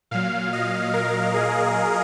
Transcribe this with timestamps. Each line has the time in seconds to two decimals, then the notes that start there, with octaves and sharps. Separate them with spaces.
0.11 A#2 F#3 F5
0.53 D#5
0.94 A#4
1.34 G#4